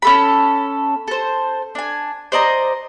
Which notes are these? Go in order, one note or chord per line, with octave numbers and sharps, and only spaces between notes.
C#4 A4 B5
A4 C5
D4 G#5
C5 D5 D#5 A#5